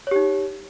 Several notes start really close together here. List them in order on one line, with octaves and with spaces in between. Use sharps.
C#5 G4 D#4